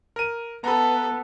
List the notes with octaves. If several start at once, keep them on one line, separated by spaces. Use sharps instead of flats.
A#4 D#7
B3 A4 A#5 B5